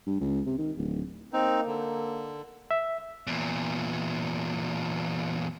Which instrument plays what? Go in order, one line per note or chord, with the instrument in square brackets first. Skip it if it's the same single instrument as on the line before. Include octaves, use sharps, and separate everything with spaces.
[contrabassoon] G2
C#2
C3
D#3
D1
[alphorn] A#3 [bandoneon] C4 D#4
[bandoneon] D3
[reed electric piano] E5
[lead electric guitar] E2 A#2